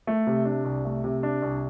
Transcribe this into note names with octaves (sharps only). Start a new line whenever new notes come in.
A3
C3
D4
C2
A3
C3
D4
C2